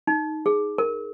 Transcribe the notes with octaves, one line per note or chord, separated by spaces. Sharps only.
D#4
G#4
A#4